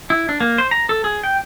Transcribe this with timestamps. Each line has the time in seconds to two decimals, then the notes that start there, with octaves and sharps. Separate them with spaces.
0.10 E4
0.29 D4
0.40 A#3
0.58 C5
0.71 A#5
0.89 A4
1.04 G#4
1.23 G5